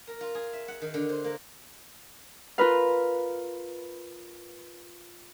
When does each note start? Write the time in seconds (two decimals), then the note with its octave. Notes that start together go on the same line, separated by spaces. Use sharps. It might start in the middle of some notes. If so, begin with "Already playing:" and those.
0.07 A#4
0.21 F4
0.35 G#4
0.53 E5
0.68 F#5
0.82 D#3
0.94 D3
1.09 C5
1.24 A#3
2.58 F4 A#4 B4 F5